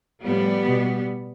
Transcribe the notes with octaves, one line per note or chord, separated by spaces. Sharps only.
A2 F3 G3 B3
B2